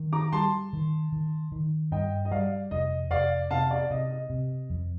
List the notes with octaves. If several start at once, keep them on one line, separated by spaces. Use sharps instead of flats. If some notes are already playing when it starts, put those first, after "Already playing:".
Already playing: D#3
A#5 D6
G3 A5 C6
D#3
D#3
D#3
G2 D#5 G5
D#5
G3 D5 F5
F1 D#5
F1 D5 F5
C3 F5 A5
D5 F5
C3 D#5
D#5
C3
F2